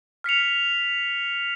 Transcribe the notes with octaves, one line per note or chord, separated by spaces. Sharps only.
F6 B6 C#7 F7